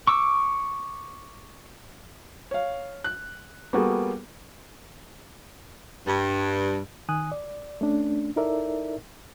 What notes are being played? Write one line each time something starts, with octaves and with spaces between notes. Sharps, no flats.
C#6 D6 E6
C#5 F5
F#6
G3 A#3 B3 F#4 G#4 A4
G2
D#3 G#5 D#6 F#6
D5
A3 C#4 D4
D#4 E4 A4 A#4 D5 E5